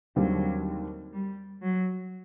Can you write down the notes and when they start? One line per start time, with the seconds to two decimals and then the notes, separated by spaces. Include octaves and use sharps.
0.16 D#2 D3 F#3 G3 C4
1.13 G3
1.62 F#3